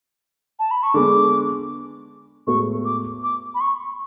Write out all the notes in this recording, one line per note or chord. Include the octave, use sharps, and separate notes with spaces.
A5
B5
C#6
D3 G#3 B3 D6
A2 G#3 B3 F#4 A4 C#6
D6
D6
B5
C#6